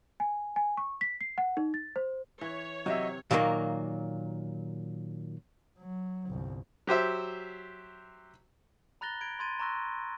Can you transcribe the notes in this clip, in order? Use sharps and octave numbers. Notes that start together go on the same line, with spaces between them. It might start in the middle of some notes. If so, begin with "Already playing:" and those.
G#5
G#5
C#6
B6
C7
F#5
D#4
A6
C5
E3 C#5
C3 F#3 D#5 E5
A#2 D#3 F#3 G3 A#3
F#3
G1 C2
F#3 G4 C5 E5
A#5 B5 F#6 A6 A#6 G7
B5 G#6 D7
B5 C6 G#6 A6 D#7
A#5 C6 C#6 E6 F#6 A#6